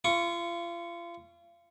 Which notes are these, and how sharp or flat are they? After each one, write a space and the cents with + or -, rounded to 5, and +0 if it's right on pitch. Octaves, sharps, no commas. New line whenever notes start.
F4 -35 C#6 +0